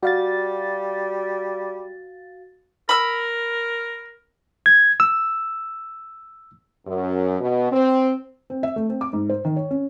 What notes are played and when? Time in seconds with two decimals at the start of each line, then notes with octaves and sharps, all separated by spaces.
0.03 G3 F#4 F5 A6
2.89 A#4 B5 E6
4.66 G#6
5.00 E6
6.87 F#2
7.41 B2
7.72 C4
8.50 C4
8.63 E5
8.76 A3
8.89 C4
9.01 D6
9.13 G#2
9.29 C5
9.45 D#3
9.56 C#5
9.71 C#4